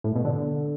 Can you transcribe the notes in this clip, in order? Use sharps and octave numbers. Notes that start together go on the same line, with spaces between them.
A2
B2
D3